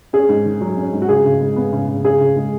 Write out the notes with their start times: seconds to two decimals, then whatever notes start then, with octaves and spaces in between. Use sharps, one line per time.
0.13 C#4 G#4
0.29 G#2
0.45 D#3
0.61 F#3
0.77 C#4
0.93 G#2
1.02 F#4
1.09 C#3 G#4
1.25 C#3
1.40 G#3
1.56 B3
1.73 C#3
1.88 C#3
2.04 C#3 G#4
2.20 C#3
2.36 G#3